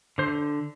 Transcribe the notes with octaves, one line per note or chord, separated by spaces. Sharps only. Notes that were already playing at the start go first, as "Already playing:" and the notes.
D3 C5